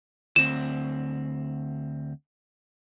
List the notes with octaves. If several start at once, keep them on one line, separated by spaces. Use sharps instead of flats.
D2 C4 E7